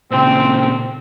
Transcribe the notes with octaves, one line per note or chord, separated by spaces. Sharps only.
A#2 C#3 C4